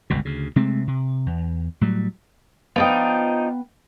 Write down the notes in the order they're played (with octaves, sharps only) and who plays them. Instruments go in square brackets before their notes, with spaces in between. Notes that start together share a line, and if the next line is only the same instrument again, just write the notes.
[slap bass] G1 C#2 B2
D2 C#3
C3 G#3 A3 C4
C3
E2
A2 F#3 G3
[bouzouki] F3 D4 D#4 [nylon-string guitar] B3 F5 G5